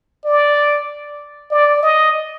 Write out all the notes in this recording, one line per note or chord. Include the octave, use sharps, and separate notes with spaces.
D5
D5
D#5